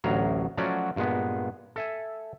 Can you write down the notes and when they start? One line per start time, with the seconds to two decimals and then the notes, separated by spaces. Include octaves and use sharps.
0.04 A1 D2 A2 F#3 F5 A#5
0.57 F3 F#3 A3 C#4 F#4 D5
0.96 G2 A#2 G#3 B3
1.76 A4 E5 G#5